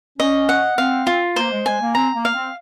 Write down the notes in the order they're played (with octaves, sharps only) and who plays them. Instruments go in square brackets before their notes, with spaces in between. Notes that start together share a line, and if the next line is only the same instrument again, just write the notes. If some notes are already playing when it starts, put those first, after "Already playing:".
[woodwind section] C#4 [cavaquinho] D#5
[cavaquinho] F#5
[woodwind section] C4 [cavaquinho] F5
[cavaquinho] F4
[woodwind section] A#3 [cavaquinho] C5
[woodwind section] G#3
[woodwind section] G#3 [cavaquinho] G#5
[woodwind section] A#3
[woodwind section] C4 [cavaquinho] A#5
[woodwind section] A#3
[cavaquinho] F5
[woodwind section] C4